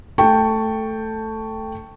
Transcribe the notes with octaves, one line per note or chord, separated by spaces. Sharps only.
A3 G5 A5 C#6